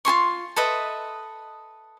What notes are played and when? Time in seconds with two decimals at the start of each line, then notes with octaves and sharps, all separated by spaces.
0.05 F4 G#4 C6 C#6
0.56 A4 B4 D#5 E5